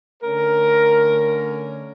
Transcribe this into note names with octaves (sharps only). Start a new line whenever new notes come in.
D3 A3 C#4 A#4